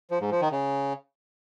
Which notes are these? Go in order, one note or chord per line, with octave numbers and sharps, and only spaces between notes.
F3
G#2
F3
D#3
C#3